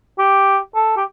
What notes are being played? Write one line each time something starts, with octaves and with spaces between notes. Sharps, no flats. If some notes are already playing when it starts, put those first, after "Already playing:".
G4
A4
G4